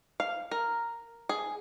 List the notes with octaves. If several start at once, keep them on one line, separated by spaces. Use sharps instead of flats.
F5
A#4
G#4